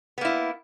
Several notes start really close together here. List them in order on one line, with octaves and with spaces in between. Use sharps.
B3 A#3 E4